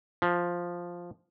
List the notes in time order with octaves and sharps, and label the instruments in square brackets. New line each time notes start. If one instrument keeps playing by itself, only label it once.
[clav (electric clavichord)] F3